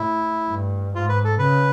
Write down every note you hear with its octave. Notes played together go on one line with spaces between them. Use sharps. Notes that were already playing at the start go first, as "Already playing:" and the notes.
Already playing: A2 E4
G2
G#2 F4
B4
A4
C#3 B4